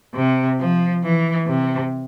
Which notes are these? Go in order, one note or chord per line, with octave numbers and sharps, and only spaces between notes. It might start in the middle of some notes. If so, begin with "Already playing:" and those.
C3
F3
E3
C3